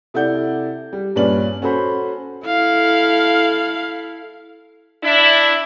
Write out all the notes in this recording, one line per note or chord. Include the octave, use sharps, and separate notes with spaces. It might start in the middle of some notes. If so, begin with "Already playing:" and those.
C3 E4 A4 D5 F#5 G6
G3
G2 A#2 C#4 B4 D5 F#7
C#4 F#4 A4 C5 B5
E4 A4 F5
D4 E4